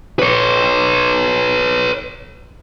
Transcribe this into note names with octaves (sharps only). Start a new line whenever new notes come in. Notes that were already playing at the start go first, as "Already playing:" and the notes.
B4 C#5